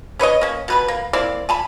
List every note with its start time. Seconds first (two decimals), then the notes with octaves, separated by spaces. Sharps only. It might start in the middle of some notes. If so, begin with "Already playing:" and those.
0.19 C#4 B4 C#5 D#5
0.41 A#3 C#4
0.68 B2 B4 B5
0.88 A#3
1.13 A#3 C4 E4 D5
1.49 G#5 A5 B5